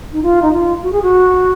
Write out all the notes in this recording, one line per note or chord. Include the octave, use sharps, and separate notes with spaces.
D#4
F4
D#4
F4
F#4
G#4
F#4